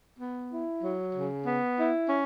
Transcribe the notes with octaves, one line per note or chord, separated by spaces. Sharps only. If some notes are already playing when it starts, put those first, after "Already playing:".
B3
E4
F#3
C#3
B3
E4
C#4